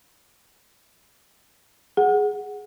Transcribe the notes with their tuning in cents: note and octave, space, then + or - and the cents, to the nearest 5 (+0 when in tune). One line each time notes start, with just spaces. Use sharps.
G#4 +0 F#5 -5